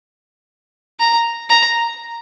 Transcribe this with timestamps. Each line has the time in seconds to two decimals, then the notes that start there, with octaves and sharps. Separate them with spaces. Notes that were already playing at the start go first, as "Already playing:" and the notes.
1.00 A#5
1.49 A#5